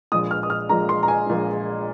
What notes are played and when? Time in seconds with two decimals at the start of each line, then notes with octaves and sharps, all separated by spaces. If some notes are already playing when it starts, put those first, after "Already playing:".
0.12 A#1 A#2 G#3 D#6
0.31 F6
0.43 D#6
0.50 F6
0.69 A#1 A#2 G#3 A#5
0.89 C6
1.03 A#5
1.08 G#5
1.27 A#1 A#2 G#3